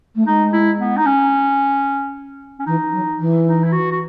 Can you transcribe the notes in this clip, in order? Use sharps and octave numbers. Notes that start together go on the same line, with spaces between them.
A3
G#3 D#4
E4
B3
D#4
C#4
C#4
E3 D#4
F#3
E3
D#4
E4
F#4
F#4